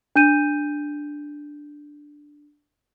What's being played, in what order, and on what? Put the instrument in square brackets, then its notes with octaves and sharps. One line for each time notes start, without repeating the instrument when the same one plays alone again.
[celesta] D4 G6 D#7